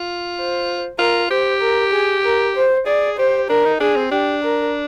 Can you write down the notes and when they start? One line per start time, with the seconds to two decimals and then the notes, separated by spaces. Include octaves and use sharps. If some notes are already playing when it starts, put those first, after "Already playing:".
Already playing: F4
0.37 C5
0.98 F4 A#4
1.30 G4 C5
1.61 A#4
1.93 G#4
2.24 A#4
2.56 C5
2.86 G#4 D5
3.18 G4 C5
3.49 D4 A#4
3.65 D#4
3.80 D4 G#4
3.96 C4
4.11 D4 G4
4.43 A#4